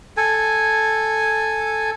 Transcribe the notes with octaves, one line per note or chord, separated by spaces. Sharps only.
A4 G#5